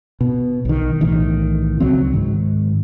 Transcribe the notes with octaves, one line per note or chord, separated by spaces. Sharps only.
B2
B1 D#3
B1 A2 D#3 E3
C#2 F#3 C4
G#2 D#3